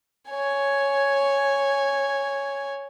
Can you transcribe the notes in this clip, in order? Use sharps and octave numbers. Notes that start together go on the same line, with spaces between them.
C#5 G#5